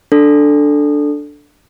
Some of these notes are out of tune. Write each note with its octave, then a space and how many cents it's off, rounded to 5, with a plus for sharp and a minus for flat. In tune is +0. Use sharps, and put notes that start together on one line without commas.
D4 +0 A4 +0